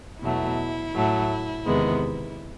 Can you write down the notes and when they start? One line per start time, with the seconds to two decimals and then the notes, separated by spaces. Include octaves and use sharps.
0.22 E2 B2 F#3 A3 E4
0.95 A2 F#3 A3
1.66 E2 C3 D#3 G#3 B3